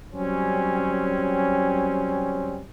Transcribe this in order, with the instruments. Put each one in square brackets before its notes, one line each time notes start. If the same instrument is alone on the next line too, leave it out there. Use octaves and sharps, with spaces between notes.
[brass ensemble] F#3 G3 C4 C#4